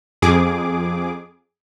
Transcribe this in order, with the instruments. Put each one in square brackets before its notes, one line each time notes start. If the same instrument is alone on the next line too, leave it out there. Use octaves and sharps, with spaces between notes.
[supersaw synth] F2 G#4 D6